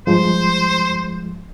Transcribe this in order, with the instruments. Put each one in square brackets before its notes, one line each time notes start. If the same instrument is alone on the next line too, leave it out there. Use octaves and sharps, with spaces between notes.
[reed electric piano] G2 F3 G#3 [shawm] C5